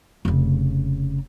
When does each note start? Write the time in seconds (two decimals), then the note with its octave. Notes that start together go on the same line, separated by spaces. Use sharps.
0.25 F1 C#3